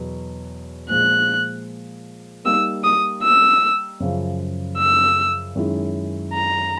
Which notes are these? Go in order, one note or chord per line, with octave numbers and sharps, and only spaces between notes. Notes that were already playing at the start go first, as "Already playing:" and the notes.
Already playing: E2 B2 F#3
A#2 F3 G#3 F#6
G3 A#3 D#4 E6
D#6
E6
F#2 C#3 F3
E6
F#2 D#3 G#3 C#4 E4
A#5